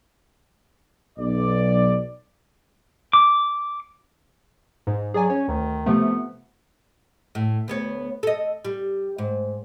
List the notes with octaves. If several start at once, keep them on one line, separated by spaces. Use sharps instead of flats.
B1 D5
D6
G#2
F#3 G#4 D5 G#5
C#4 C#5
D2 D#3
C3 F3 A3 B3
A2
D2 B3 C#5
A4 D#5
G3
G#2